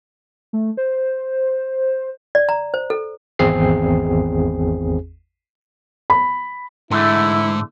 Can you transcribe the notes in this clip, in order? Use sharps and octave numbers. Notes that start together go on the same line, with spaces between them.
A3
C5
D5
A#5
C5
A4
G#1 E2 C4 G#4 C7
B5
G#2 D3 E3 A3 E4